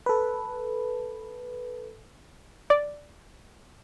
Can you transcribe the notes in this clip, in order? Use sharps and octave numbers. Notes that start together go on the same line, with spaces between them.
A4 B4
D5